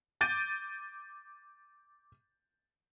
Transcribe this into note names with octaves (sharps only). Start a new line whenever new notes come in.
D6 G6 A6 D7 D#7